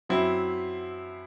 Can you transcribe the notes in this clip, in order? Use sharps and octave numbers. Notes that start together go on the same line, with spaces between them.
F#2 F#3 C4 E4